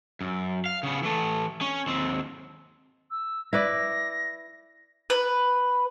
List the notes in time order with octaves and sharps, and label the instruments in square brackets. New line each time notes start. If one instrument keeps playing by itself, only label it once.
[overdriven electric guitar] F#2
F5
C#3 B3
E3 A3
C#4
D#2 C4
[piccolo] E6
[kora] E4 B4 D5 [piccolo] A#6
[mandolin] B4